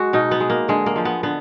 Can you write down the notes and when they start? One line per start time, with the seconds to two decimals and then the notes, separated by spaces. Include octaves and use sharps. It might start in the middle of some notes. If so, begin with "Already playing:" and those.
Already playing: G#3 F#4
0.13 B2 D#4
0.31 B3
0.40 G#3
0.50 A#3
0.68 D3 G#3
0.86 A#3
0.96 F3 G#3
1.05 B3
1.23 D3 B3